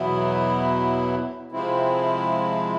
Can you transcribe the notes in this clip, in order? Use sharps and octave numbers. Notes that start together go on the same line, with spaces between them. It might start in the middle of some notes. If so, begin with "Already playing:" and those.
Already playing: E2 B2 F#3 B3 E4
C3 F3 G#3 C4 E4